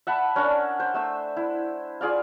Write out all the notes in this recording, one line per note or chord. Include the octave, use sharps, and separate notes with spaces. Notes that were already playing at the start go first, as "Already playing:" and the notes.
E5 F#5 A5 B5
C#4 D4 A#4
C5
A3 E5 E6
E4
F4 G#4 D5 F5